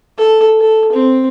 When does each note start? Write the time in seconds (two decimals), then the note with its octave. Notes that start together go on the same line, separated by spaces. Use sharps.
0.17 A4
0.60 A4
0.92 C4